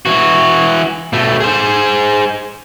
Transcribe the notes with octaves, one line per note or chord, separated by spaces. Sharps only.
E3 F#4
B2 A3
G#4 C5